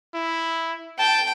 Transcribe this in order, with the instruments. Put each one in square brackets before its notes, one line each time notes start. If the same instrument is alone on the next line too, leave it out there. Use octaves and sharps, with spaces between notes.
[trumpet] E4
[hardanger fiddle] G5 [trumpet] A5